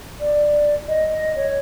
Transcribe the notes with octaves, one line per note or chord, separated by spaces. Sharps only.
D5
D#5
C#5